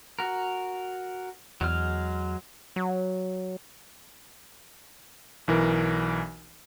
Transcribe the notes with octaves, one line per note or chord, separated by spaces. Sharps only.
F#4 A#4
E2 F#3 G#3 F6
F#3
B1 E3 A#4